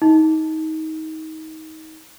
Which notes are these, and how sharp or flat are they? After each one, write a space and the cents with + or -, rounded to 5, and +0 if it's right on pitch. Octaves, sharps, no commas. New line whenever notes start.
D#4 +25